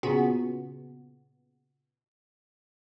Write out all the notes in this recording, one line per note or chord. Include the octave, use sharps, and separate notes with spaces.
A#2 C#3 B3 C#4 F#4